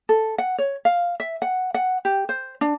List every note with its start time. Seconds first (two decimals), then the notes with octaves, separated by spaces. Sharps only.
0.09 A4
0.38 F#5
0.58 C#5
0.85 F5
1.20 E5
1.42 F#5
1.74 F#5
2.05 G4
2.29 C5
2.61 D4